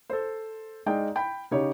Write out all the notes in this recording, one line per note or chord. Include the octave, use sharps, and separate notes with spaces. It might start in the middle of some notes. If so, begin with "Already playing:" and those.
A4 C5
G#3 D#4 D5 F5 G5
G5 B5
C#3 D#4 G4 C#5